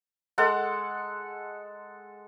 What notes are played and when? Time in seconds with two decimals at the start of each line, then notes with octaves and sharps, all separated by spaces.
0.38 G#3 A4 F#5